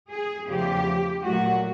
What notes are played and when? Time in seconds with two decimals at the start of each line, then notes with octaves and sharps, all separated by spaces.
0.11 G#4
0.48 E2 C#3 F3 A3 G4
1.23 A#2 F#3 A3 F#4